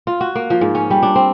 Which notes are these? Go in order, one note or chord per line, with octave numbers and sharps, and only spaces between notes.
F4
F#4
A#3
F3
G#2
C#4
G3
D4
C4